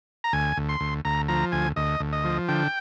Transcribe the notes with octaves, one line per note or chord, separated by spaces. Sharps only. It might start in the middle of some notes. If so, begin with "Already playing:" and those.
A#5
D2 G#5
D2
C6
D2
D2 A#5
F3 A#5
D2 G#5
D2 D#5
D2
D#5
F3
D3 G5